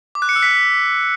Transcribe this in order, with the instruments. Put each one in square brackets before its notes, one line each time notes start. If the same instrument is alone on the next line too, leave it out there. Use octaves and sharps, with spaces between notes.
[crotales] D6
F#6
C#7
E6
B6